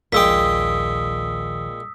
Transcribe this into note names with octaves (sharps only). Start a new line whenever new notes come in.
A#1 D#2 A#2 G#3 G5 D#6 E6 B6